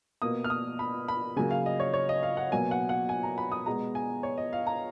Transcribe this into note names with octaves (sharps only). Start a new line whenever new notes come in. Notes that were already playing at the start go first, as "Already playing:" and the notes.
B2 A#3 D#6
F6
D#6
B5
B5
C#3 F#3 A#3 G#5
F5
D#5
C#5
C#5
D#5
F5
F#5
B2 F#3 A#3 G#5
F#5
F#5
G#5
A#5
B5
D#6
B2 G#3 A#5
G#5
C#5
D#5
F5
A#5